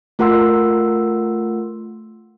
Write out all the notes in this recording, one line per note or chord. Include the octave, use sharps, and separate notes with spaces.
A3 F4 A#4 F#5 C6 E6